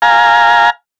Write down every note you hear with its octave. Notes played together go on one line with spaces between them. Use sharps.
F5 G#5 A#5